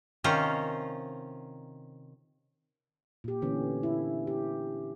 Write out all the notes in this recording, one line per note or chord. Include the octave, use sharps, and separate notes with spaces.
C3 D#3 C#4 F4 C5 A#5
A#2 G4
D3 E3 B3 C#4
E4
G4